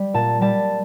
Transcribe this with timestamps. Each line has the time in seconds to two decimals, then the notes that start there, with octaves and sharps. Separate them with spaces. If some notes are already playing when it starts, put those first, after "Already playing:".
Already playing: G3
0.14 A#2 A5
0.41 G3 A5